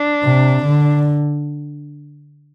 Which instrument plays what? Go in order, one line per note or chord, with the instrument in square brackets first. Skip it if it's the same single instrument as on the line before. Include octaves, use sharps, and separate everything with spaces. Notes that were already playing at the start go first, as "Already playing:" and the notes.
Already playing: [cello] D4
[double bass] C3
D3